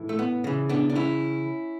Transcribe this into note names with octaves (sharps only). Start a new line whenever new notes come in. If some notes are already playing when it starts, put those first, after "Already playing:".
Already playing: A2 E3
A3
B3
C#3 E3
B3 D4
D4
C#4 E4